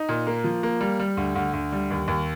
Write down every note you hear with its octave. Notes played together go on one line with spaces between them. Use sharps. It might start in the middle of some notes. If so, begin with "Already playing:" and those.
Already playing: D#4
A#2
A#3
F3
A#3
G3
G3
D2
D2
D2
G3
D#2
D#2